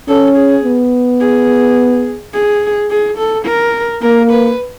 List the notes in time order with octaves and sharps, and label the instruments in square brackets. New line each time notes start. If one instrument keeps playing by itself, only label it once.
[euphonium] C#4 [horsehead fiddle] A4
[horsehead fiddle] G#4
[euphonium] B3
[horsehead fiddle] G#4
G#4
G#4
A4
A#4
[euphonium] A#3 [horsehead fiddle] A#4
[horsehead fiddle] B4